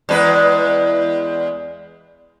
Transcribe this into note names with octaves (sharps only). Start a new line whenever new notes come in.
E2 G#3 B4